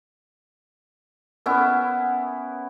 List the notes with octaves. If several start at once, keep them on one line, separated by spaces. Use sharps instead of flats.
B3 C#4 E4